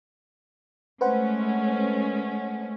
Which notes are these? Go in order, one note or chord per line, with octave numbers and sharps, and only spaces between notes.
G#3 A3 C#4 B4 C5 F#5